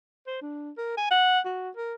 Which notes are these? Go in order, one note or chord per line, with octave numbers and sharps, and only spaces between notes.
C5
D4
A#4
G#5
F#5
F#4
A#4